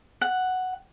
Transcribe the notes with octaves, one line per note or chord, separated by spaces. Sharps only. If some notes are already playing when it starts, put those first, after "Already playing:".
F#5